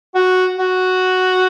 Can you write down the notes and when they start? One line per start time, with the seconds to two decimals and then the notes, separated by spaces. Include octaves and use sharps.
0.15 F#4
0.59 F#4